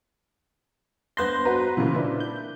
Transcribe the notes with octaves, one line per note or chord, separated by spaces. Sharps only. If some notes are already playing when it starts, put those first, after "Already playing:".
G2 B3 C5 C6 F#6 A#6
F#4 B4 A#5
A#2 C#3 E3
D4 E4 B4
G6